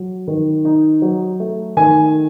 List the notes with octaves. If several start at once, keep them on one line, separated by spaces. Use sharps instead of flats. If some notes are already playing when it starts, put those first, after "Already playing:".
Already playing: F#3
D#3
D#4
F#3
A3
D#3 G#5